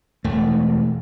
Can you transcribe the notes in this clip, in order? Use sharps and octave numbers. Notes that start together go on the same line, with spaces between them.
E1 A3